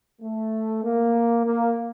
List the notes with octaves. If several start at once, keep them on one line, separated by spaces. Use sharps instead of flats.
A3
A#3
A#3